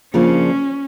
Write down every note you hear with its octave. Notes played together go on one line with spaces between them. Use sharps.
C#3 F3 A#3 C#4 D4